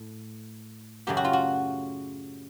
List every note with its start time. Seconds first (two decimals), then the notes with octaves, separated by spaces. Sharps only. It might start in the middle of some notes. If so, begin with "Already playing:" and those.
Already playing: A2
1.07 F#2 C#3 F#3 A3 G4
1.17 F#4
1.25 F4
1.33 F#4